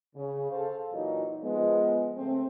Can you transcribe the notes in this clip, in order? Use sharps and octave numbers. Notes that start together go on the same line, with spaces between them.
C#3
A4 C5 F5
A#2 E3 F#3 D#4
F3 G#3 B3
C#3 A3 C4